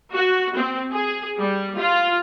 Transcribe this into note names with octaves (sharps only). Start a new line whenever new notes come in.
F#4
C4
G#4
G3
F4